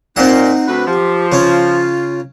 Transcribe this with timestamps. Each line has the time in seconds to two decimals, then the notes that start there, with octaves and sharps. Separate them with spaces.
0.16 A#2 C4 D#4 F#5
0.68 D2 B4
0.87 F3 G4
1.32 C#3 C#4 F4